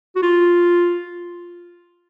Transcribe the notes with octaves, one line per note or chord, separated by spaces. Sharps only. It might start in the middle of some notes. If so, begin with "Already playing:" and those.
F#4
F4